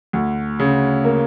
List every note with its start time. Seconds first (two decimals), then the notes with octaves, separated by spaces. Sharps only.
0.13 D2
0.59 C#3
1.04 A#3